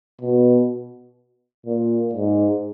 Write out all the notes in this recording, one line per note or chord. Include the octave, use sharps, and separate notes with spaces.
B2
A#2
G#2